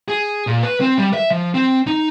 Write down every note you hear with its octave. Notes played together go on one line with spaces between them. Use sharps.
G#4
A#2
B4
C4
G3
E5
F3
C4
D#4